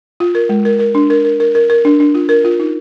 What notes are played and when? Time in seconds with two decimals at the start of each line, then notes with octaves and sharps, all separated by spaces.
0.20 F4
0.35 A#4
0.49 G#3
0.65 A#4
0.79 A#4
0.95 D4
1.10 A#4
1.25 A#4
1.40 A#4
1.55 A#4
1.70 A#4
1.85 D4
2.00 D4
2.15 F4
2.29 A#4
2.45 F4
2.60 D#4